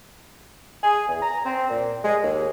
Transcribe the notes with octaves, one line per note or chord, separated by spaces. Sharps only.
G#4
E2
A#5
C4
A#2
G#3
D#2